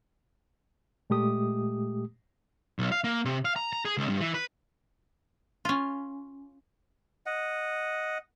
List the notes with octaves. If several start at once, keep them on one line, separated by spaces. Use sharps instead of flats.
A#2 G#3 A3 G4 D#6
B1
F5
A#3
C3
F5
A#5
A#5
G#4
C#2
G2
E3
B4
C#4 F4
D#5 F#5